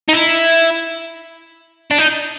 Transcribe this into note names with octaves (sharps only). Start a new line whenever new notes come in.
D#4
E4
D4
D#4